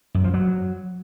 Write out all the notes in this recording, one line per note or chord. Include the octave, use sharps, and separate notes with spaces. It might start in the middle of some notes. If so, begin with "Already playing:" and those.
F#2
F3
F#3